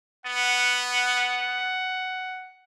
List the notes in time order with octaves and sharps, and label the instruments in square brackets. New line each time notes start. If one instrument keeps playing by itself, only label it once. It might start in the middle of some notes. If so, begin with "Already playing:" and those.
[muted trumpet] B3 [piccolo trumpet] F#5